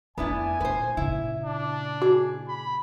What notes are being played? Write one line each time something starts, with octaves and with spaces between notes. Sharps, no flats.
F2 A3 B3 D4 E4 G#5
A#2 A3 B4 C5
A#2 C#3 E4
D4
F#4 G#4
B5